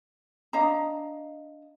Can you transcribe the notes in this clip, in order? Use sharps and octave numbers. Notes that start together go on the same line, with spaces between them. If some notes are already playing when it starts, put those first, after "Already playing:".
D4 D#5 F5 A#5